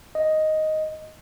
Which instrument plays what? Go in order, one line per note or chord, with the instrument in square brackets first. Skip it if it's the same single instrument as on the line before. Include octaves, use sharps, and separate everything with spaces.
[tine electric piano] D#5